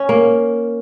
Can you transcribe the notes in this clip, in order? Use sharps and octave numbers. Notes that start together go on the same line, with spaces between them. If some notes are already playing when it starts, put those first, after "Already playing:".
Already playing: C#4
A#3